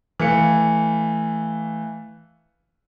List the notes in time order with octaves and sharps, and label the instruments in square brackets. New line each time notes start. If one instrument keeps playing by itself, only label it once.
[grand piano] E3 A3 F5 C#7